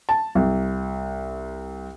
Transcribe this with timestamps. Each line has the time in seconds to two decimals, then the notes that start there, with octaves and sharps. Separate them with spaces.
0.09 A5
0.35 C2